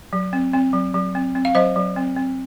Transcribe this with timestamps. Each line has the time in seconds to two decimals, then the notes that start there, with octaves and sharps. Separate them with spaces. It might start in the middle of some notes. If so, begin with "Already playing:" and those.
0.13 F#3
0.33 C4
0.53 C4
0.73 F#3
0.94 F#3
1.15 C4
1.35 C4
1.45 F5
1.55 F#3 C5 D#5
1.76 F#3
1.96 C4
2.16 C4